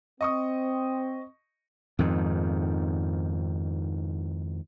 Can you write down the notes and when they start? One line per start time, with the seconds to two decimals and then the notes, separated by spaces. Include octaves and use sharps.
0.21 C4 D#5 C#6 D#6
1.99 F2 G#2 D#3